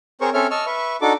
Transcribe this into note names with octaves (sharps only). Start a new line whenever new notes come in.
C4 G#4 A#4 C5 C#5 C#6
C4 C#4 A4 C#5 E5 F6
D#5 A5 C#6 E6 F6
B4 E5 C#6
D4 D#4 F#4 A4 D6